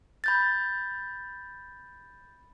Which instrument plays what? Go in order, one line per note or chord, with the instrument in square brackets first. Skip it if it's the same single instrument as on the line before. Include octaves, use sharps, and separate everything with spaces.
[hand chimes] B5 G6 A6